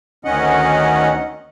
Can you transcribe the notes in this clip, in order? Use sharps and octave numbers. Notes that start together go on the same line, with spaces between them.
D2 D#3 C#4 D#5 F#5